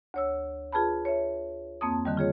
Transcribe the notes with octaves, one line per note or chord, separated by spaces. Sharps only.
D2 C#5 E6
F4 G#4 B4 A5 B5
C#5 E5
F2 A#3 C4 A5 D#6
D3 D#3 G3
F4 G#4 C#5